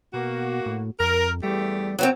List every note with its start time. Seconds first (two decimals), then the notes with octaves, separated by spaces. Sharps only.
0.14 B2 A#3 F#4
0.66 A2
1.00 F2 A#4
1.43 E2 G3 A3 G4
1.99 F#3 B3 C4